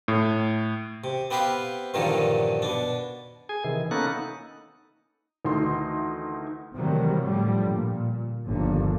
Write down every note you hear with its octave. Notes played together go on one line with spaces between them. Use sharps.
A2
C3
B3 C4 G4 B4 F5
G2 A#2 D3 D#3 F3 F#3
B2 D4
G#4 G#5
C3 D#3 E3
A#3 B3 C#4 D#4 A4 F#6
D#4
D2 D#3 E3 A3 D#4 C6
C3 D#3 E3 F#3 G3 A3
A2 D3 F3 G3
A#2
G1 D#2 D3 F3